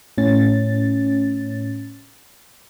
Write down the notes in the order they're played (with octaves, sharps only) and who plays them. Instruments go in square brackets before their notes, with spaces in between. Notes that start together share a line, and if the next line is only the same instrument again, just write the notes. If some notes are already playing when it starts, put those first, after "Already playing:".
[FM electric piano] A2 C#4 A6